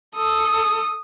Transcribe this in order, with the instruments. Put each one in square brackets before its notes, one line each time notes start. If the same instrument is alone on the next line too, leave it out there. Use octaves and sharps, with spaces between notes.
[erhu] A4 [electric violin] D#6